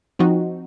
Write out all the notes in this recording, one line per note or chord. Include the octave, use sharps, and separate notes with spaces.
F3 C4 D#4 F#4